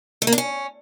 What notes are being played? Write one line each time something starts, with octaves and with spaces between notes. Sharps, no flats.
A3
A#3
D4
C#4